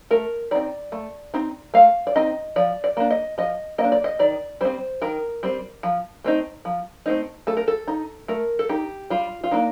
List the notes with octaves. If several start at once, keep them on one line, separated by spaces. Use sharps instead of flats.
A3 A#4
C4 D#4 D5
A3
C4 D#4
A3 F5
D5
C4 D#4 D#5
F3 D5
D5
A#3 D4
D#5
F3 D#5
A#3 D#5
D4
D5
D#5
D#3 D5
G3 C4 C5
D#3 A#4
G3 C4
F3
A3 C4 D#4
F3
A3 C4 D#4
A3 A4
A#4
A4
D#4
A3 A#4
A4
D#4 G4
G3 F4
F4
A#3 D4 D#4